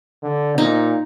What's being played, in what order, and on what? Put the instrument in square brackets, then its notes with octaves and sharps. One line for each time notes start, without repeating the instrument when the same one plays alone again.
[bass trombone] D3
[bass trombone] A#2 [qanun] D#4